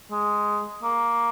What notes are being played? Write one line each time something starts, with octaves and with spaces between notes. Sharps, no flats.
G#3
A#3